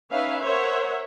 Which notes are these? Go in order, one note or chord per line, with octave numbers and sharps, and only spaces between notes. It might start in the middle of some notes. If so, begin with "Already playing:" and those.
C#4 D#4 B4 C#5 E5 F5
A#4 C5 C#5 E5 F#5